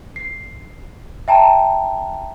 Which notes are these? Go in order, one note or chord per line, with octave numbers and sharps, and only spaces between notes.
C7
E5 G5 A5 A#5